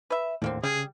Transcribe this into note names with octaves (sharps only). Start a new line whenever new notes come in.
B4 E5
D#2 A2 D3 A#3 C4
C#3 G3 G#4